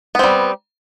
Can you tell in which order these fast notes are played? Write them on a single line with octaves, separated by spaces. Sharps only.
B3 C4 G3